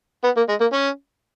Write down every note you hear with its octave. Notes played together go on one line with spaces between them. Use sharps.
B3
A#3
G#3
A#3
C#4